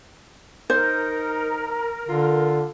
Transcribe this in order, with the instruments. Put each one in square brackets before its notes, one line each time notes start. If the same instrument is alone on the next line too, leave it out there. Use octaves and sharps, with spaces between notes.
[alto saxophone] D#4 [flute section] A#4 [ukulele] C5
[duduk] D3 [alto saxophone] F4